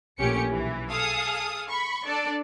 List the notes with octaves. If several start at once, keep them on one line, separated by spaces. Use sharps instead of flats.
A#1 A3 C#4 G4 C#7
B1 E3
G#4 A4 F5 D#6
B5 C#6
D4 A4 D5